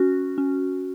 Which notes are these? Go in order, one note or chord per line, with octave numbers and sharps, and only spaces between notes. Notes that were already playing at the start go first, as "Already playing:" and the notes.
Already playing: C#4 F#4
C#4